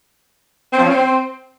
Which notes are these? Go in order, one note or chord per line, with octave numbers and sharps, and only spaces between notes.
C4
F3
C#4
C4